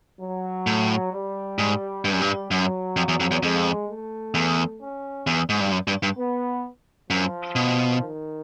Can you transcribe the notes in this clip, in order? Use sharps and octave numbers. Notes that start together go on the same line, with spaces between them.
F#3
A2
G3
G#2
G2 G3
F#2
G2
F#2 F#3
F2
E2
F2
E2
F2 G#3
A3
E2
C#4
E2
G#2
G2
F#2
G2
G2
B3
F#2 F3
B2
D#3